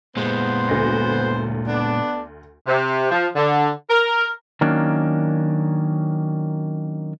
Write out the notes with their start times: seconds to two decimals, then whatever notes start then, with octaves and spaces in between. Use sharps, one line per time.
0.17 A#2 G#3 B3 C5
0.69 D2 A#6
1.67 B3 D4
2.67 C3
3.12 F3
3.36 D3
3.90 A#4
4.61 D#3 F#3 A#3 C#4 D4